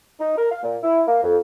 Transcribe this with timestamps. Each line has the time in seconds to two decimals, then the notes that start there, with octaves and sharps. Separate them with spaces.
0.20 D#4
0.38 A#4
0.52 F5
0.63 A#2
0.83 E4
1.07 A#3
1.23 F2